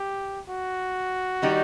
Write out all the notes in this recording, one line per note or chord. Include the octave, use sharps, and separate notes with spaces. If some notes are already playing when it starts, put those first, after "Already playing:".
Already playing: G4
F#4
D#3 G3 D#4 G4